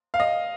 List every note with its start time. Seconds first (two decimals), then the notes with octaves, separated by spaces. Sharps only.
0.14 F5
0.20 D#5